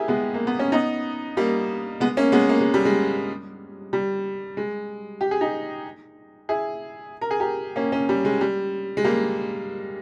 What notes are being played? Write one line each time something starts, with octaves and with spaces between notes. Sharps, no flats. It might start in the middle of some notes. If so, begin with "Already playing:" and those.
Already playing: E4 G4 G#4 A#4
G#3 B3
A#3
B3
C#4
B3 D#4
G3 A#3
G#3 B3
A#3 C#4
G#3 B3
A#3
G#3
G3
G#3
G3
G#3
G4
G#4
D#4 G4
E4 G#4
A#4
G#4
G4 A#4
A#3 C#4
A#3 C#4
G3
G#3
G3
G#3
G3 A#3